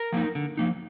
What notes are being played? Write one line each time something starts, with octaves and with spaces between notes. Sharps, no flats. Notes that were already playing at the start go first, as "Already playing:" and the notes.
Already playing: A#4
F3 A#3 D#4
D3
F3 A#3 D#4